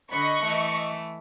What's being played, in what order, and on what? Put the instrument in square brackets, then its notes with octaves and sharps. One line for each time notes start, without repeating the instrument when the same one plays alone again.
[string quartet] D3 B5 F#6 [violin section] D#5 C#6
[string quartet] E3 A3